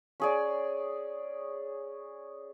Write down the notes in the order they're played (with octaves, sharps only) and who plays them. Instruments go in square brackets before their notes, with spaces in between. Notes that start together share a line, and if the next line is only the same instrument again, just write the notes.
[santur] C#4 G#4 D5